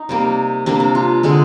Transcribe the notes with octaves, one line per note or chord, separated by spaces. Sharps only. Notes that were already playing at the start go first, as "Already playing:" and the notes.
Already playing: D#4
C3 G3 A#3
C3 G3 A#3 D4
D4
F4
D3 G#3 G#4